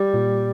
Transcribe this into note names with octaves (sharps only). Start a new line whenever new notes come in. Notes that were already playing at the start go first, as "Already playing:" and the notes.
Already playing: G3
A#2